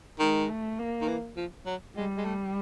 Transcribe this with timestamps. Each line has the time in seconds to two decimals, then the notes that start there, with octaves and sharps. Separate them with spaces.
0.19 D#3 G#3
0.49 A3
0.79 A#3
1.01 D#3
1.08 E3
1.37 F3
1.66 F#3
1.96 G3 G#3
2.17 G#3
2.25 A3